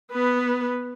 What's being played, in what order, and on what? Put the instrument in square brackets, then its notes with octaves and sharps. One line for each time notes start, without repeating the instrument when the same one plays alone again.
[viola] B3 B4